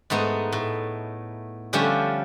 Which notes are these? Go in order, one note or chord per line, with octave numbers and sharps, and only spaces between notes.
G#2 A3 B3 D#4
A2
D3 F3 G3 A3 C#4 D4